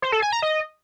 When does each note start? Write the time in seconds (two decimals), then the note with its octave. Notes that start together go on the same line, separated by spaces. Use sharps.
0.02 C5
0.12 A4
0.22 G#5
0.32 A#5
0.42 D#5